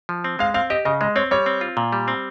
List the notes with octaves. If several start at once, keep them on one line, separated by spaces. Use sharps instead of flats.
F3
C4
G#3 F5
C4 F5
G4 D#5
C#3 D#5
G#3 D#5
C4 C#5
G3 C#5
C4
F4
A#2
G3
C4